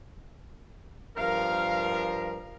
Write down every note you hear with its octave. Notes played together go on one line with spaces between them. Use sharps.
G2 F3 A#4 F5